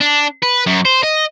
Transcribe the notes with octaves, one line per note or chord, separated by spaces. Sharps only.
D4
B4
F#2
C5
D#5